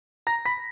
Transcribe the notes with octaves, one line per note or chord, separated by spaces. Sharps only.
A#5 A#6
B5 B6